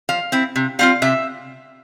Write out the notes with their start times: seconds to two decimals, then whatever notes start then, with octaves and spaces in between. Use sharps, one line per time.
0.09 F3 F5
0.32 C4 E4
0.56 C3
0.79 G3 C4 F4 F5
1.02 C3 E5